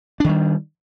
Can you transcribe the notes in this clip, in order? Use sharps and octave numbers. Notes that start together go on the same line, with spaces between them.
D#3 G3 D4